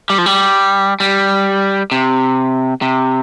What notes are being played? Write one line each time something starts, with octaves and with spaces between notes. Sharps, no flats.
G3
F3
G3
G3
C3
C3